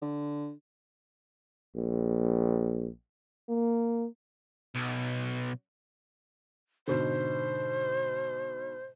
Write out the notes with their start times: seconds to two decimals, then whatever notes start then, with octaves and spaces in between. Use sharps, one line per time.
0.02 D3
1.76 A#1
3.49 A#3
4.75 B1
6.88 G#2 B2 D3 C5